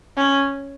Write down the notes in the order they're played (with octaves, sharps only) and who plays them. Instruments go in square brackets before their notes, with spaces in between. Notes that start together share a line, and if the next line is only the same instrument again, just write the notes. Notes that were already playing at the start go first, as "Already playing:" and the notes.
[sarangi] C#4